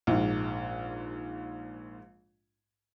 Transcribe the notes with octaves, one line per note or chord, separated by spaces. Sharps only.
A#1 G#2